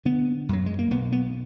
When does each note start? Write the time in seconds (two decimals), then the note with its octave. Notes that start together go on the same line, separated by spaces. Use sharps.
0.05 D3 B3
0.49 F#2 F#3
0.66 G#3
0.79 A#3
0.91 B1 B3
1.12 B3